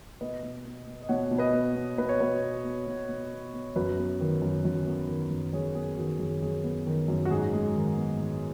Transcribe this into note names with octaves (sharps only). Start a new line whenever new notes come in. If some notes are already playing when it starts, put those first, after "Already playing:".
B2 B4 D#5
B2
B3
B3
D#5
B2 C#5 F#5
B2
B4 D#5
B3
B3
B2 B4
C#5
B2 F#4 B4
B3
B3
B2
B2
B3
B3
F#2 F#4 B4
B3
D#3
F#2
F#2
B3
D#3
F#2
F#2 G#4 C#5
B3 G#4
D#3 F#4
F#2 G#4
F#2 G#4
B3
D#3
F#2
F#4
G#2 G#4
G#3
D#3
B3
G#2